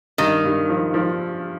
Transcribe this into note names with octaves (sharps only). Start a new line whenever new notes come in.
G2 D#3
G2
F3
F3